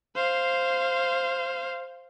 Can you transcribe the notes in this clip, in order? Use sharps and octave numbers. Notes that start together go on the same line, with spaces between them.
C5 F5